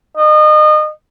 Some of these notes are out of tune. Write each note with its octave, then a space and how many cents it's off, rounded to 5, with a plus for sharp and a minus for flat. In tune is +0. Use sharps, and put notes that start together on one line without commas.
D#5 -30